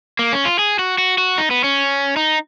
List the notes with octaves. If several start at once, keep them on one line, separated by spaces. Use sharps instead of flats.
A#3
C#4
F4
G#4
F#4
F#4
F#4
D#4
B3
C#4
D#4